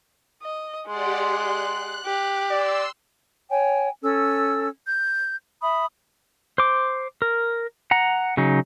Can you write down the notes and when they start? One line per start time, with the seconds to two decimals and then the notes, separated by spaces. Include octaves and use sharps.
0.42 D#5
0.88 G#3 G4 D5 F#5 C6
1.22 F#6
2.05 G4
2.50 D5 C6 E6
3.50 C#5 G5 G#5
4.03 C#4 A4 E6
4.87 G6
5.62 E5 B5 D#6
6.58 C5 D6
7.22 A#4
7.91 F#5 A#5
8.37 C#3 F#3 D#4